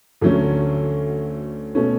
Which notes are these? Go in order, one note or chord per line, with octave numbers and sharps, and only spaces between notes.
D2 D3 F#3 A3 C#4
B2 A3 C#4